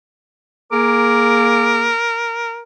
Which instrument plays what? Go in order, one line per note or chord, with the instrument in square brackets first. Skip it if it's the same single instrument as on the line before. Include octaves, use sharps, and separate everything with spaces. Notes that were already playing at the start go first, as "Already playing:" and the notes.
[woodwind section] A#3 G#4 D6 [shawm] A#4